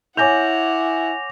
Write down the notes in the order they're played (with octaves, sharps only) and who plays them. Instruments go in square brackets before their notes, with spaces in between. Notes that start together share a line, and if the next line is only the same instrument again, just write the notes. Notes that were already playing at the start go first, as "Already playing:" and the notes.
[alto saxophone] E4 [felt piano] C#5 G#5 G6 [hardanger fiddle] F#5 [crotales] D6 A#6 F7